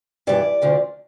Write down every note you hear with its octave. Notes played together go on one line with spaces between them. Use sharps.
G2 E3 D5
D2 D3 F3